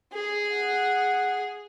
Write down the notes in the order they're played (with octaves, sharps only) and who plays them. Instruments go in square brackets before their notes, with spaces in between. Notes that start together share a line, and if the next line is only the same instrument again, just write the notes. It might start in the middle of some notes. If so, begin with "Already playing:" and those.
[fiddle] G#4
[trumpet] F#5